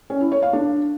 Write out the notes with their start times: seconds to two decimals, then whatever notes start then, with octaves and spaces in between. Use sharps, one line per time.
0.10 C#4
0.21 E4
0.32 C#5
0.42 F5
0.53 D4